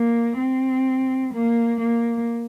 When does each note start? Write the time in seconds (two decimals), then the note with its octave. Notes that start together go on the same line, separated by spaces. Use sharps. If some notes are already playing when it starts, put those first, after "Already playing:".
Already playing: A#3
0.38 C4
1.33 A#3
1.80 A#3